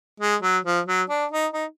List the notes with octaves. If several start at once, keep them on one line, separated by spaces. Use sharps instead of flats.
G#3
F#3
F3
F#3
D4
D#4
D#4